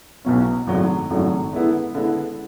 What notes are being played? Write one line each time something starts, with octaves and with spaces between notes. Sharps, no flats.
B1 B2 F#3 C#4
G#1 F#2 C#3 F#3 A3
G#1 F#2 C#3 F#3 A3
D3 G#3 B3 E4
D3 G#3 B3 E4